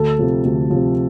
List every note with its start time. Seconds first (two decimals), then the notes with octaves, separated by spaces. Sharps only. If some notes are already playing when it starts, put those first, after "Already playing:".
Already playing: D2 A4
0.19 C3 F3
0.45 D2
0.70 C3 F3